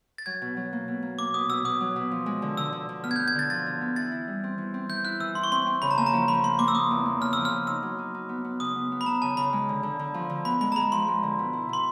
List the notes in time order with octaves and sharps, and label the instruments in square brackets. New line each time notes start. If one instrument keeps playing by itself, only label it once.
[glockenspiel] A6
[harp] F#3 [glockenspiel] G#6
[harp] B2
F#3
A#3
B2
A#3
[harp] A#3 [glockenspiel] D6
[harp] B2 [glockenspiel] D#6
[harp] B2 [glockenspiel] E6
[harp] B2 [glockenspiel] D#6
[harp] F#3
B2
F3
G#3
D3
[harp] D3 [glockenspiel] E6
[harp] D3
D3
[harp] B3 [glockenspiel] F6
[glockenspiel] G#6
[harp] B3 [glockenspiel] G6
[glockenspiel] G#6
[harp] D3 [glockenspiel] A6
[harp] F3 [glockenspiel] A6
[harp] D3
B3
[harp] E3 [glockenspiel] A6
[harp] E4
G3
C4
E3
C4
[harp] E3 [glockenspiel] G6
[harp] E4 [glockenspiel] F#6
[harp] E3 [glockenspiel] E6
[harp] E4 [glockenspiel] C6
[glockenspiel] C#6
[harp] C4 [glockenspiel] C6
[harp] C4
[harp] C#3 [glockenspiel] B5
[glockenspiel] A#5
[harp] A#3 [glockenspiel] A5
[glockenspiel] A#5
[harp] F3
[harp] F3 [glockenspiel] B5
[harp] A#3 [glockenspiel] C6
[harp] A#3 [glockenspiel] D6
[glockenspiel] E6
[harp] A#3 [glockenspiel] D#6
[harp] E2
A#3
[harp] C#3 [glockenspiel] F6
[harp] F3 [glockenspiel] E6
[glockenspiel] F6
[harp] C#3
[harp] D#4 [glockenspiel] E6
[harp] F#3
D#4
D#4
B3
B3
[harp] C#3 [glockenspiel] D#6
[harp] B3
B3
[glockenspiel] B5
[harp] B3 [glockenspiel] A#5
[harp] C#3 [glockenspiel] A5
[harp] C#3 [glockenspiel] B5
[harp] G#3
D3
D3
D3
F3
D3
[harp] B3 [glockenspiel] B5
[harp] G#3 [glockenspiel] B5
[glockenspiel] A#5
[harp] G#3 [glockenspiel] B5
[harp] F3 [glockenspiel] C6
[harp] G#3
D3
B2
E4
[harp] B2 [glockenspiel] C6